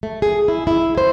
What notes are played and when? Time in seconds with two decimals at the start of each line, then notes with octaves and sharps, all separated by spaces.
0.03 A3
0.22 G#4
0.48 E4
0.67 E4
0.98 C5